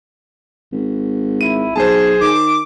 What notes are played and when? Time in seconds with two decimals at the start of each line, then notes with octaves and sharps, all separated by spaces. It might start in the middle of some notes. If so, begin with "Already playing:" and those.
0.72 G#1
1.41 E4 D#7
1.76 B1 G#4 C5 A5
2.21 D#3 D6